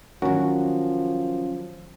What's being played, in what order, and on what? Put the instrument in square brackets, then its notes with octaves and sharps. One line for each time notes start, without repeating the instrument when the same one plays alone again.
[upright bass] D#3 F#3 [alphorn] F3 [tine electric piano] C#4 [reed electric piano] F#4 A#4